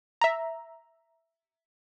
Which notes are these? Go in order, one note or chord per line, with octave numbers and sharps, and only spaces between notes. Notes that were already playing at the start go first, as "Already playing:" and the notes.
E5 A#5